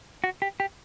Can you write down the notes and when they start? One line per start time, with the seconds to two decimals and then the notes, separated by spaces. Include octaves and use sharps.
0.24 F#4
0.42 G4
0.60 G4